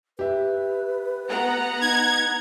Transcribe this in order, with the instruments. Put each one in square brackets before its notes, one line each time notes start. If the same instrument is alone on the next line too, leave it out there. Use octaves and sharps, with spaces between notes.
[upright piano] G4 E5 [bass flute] B4
[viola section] B3 F#5 A#5
[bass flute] D#4 [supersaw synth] G#6